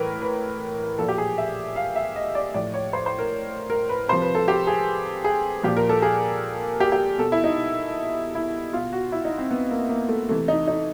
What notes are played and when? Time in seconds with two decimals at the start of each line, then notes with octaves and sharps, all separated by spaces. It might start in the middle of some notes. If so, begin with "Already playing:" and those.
Already playing: A2 E3 A#4 B4
0.22 B4
0.99 A#2 F3 A4
1.08 G4
1.18 G#4
1.38 E5
1.76 F5
1.96 E5
2.16 D#5
2.35 D5
2.54 A2 F3 D5
2.74 C#5
2.93 C5
3.06 C5
3.19 A#4
3.70 A#4
3.89 B4
4.08 C3 F3 C5
4.22 B4
4.35 A4
4.48 G4
4.67 G#4
5.24 G#4
5.63 A#2 F3 G4
5.77 A#4
5.89 A4
6.02 G#4
6.80 G4
6.92 G4
7.18 B2 A4
7.32 E4
7.44 D#4
8.35 E4
8.73 B2 F4
8.93 F#4
9.12 E4
9.25 D#4
9.38 C4
9.51 B3
9.71 A#3
9.89 A#3
10.09 A3
10.28 C3 E3 A3
10.48 D#4
10.68 D#4